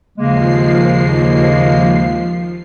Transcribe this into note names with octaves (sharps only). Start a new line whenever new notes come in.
D#2 C#3 F3 G#3 A#3 C7